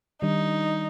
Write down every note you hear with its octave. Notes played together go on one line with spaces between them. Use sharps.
D#3 G3 D4 D#4